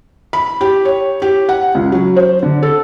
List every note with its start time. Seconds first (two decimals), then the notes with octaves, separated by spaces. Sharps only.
0.33 B5
0.61 G4
0.85 C#5
1.22 G4
1.49 F#5
1.75 C#2
1.92 F#3
2.16 C5
2.43 D3
2.63 A4